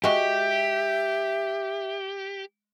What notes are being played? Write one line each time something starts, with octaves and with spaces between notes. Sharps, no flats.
G#3 F#4 G4 E5